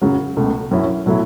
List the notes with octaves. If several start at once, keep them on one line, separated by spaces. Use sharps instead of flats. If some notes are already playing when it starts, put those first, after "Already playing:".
F#2 C#3 F#3
C#2 B2 A3
F#2 F#3 C#4 E4
B2 F#3 A3 E4